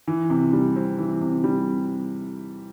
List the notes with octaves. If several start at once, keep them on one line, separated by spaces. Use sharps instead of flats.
E3
C3
G3
C4
E3
C3
G3